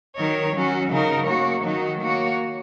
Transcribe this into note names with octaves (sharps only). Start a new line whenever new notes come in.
D#3 F#3 D#4 A#4 C#5
F#3 C#4 F#4
C#3 F#3 D#4 A#4
A#3 F#4 C#5
D#3 F#3 D#4 F#4
A#3 F#4 C#5